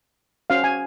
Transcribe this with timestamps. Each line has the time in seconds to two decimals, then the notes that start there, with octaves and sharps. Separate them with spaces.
0.50 C#4 F#4 C5 F5
0.64 G#5